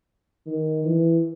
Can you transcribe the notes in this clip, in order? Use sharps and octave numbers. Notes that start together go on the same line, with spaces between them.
D#3
E3